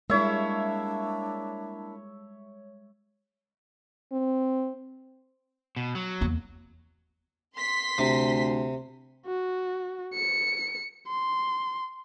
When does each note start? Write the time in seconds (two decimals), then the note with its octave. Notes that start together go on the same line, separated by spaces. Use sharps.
0.10 G3 G#3 A#3 D4 E4 C#5 E5
4.13 C4
5.76 B2
5.95 F#3
6.21 E2 A#3
7.54 C6 B6
7.98 D2 C3
9.26 F#4
10.14 C#7
11.07 C6